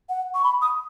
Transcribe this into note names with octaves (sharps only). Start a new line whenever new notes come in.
F#5
C#6
B5
D#6